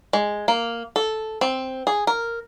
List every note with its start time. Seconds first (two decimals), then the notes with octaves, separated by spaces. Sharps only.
0.13 G#3
0.48 A#3
0.96 A4
1.41 C4
1.87 G#4
2.07 A#4